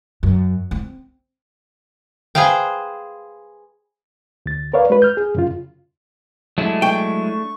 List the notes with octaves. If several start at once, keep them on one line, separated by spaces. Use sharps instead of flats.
F#2
C4
G#4 B4 C5 F5 G5
D2 A6
A#4 B4 C#5 D5 F5
G#3 F#4 B4
F6 G6
G#4
F#2 C#3 F4
F#3 G#3 A3 D4 E4
G5 C#6